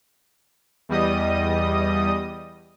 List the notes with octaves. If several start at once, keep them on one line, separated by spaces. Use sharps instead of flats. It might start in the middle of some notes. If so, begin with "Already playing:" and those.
E2 G3 D#5 D#6